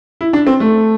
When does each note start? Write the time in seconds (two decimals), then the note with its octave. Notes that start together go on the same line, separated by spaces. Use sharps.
0.21 E4
0.33 D4
0.47 C4
0.60 A3